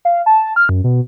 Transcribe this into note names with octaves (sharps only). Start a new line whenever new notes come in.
F5
A5
F6
F#2
B2